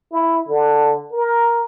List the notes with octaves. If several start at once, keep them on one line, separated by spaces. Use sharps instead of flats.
E4
D3
A#4